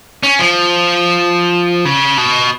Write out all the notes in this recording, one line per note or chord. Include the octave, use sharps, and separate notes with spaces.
C#4
F3
C#3
B2